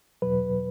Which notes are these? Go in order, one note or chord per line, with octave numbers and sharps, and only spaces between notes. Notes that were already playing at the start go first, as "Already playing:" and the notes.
E2 B2 F#3 B4